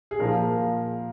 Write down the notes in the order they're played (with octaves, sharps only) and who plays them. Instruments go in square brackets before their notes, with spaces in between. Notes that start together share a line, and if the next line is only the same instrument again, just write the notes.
[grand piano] G#4
A#2 F3 A#4